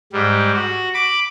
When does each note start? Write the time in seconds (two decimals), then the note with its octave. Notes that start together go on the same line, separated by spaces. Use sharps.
0.13 G#2 G3
0.54 F#4
0.94 B5 D6